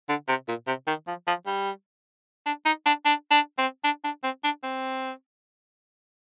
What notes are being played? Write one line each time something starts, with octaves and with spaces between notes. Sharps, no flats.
D3
C3
A#2
C3
D#3
F3
F3
G3
D4
D#4
D4
D4
D4
C4
D4
D4
C4
D4
C4